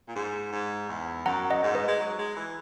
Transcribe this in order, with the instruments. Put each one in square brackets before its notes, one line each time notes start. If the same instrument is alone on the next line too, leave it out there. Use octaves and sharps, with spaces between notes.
[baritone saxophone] A#2
G#2
G#2
E2
[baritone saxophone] F#2 [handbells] F#5 A#5
[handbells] D#5 F#5
[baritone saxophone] G#2
[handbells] B4 D#5
[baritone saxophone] G#3
F#3
G#3
E3